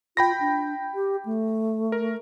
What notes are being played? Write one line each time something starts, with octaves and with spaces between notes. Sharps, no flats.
F4 G5 B5 A#6
D4
G4
A3
A#4